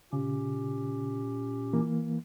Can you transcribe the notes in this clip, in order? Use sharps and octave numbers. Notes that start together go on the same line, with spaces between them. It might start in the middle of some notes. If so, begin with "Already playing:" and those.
A#2 C#3 C#4 G4
E3 A#3